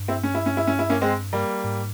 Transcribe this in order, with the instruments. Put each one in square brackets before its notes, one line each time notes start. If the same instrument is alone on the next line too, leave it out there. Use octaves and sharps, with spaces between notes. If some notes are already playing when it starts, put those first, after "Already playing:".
Already playing: [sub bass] G2
[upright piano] C4 E4
C#4
E4
C#4
E4
C#4
E4
A#3 C#4
G#3 C4
G3 A#3
[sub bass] G#2